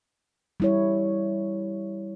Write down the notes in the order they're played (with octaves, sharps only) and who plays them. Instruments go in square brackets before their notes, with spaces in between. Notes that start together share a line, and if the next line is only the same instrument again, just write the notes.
[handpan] G3 E4 C#5